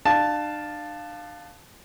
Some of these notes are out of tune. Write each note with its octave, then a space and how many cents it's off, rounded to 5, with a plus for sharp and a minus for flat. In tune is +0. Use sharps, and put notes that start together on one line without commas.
D4 +40 F5 +10 A5 +0